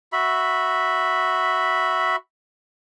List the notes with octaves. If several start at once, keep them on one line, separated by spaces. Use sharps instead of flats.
F#4 E5 B5